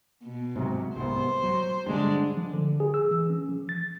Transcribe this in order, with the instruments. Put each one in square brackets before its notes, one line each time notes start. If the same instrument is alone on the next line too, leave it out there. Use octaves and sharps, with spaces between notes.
[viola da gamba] B2
[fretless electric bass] G#2 C3 F#3
[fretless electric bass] C2 G#2 B3 [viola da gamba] C5
[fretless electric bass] F#3
[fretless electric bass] G2 D3 [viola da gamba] G#3 D4
[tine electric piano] F3
D3
G#4
E6
E3
C#4
F3
A6